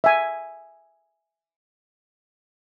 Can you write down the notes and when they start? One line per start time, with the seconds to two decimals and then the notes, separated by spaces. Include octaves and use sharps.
0.04 E5 G#5